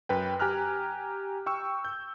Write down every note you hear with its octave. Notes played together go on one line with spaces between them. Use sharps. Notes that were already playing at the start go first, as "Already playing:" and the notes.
F#2 B4 G5
G4 G#5 A#5 F6 F#6
G5 C#6 E6
G6